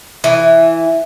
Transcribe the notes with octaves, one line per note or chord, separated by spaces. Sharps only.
E3